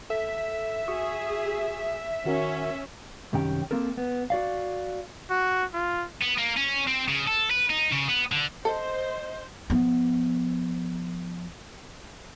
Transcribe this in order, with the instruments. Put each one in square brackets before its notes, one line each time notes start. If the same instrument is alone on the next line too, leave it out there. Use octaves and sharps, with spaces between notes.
[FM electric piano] A4 [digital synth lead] E5
[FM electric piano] F#4 C#6 D#6 [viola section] G#4
[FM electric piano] D#3 F#4 A#4 [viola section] C#4
[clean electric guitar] C2 F#2 D#3 C#4 G4 G5
A#3 C4 A4 A#4
B3
F#4 D5 F5
[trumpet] F#4
F4
[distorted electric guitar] B3
A#3
C#4
C4
C#3
A4
B4
D#4
C#3
B3
D3
[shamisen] A4 [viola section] C5 [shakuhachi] D#5
[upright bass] F3 B3